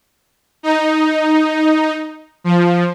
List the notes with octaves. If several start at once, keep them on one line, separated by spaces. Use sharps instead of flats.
D#4
F3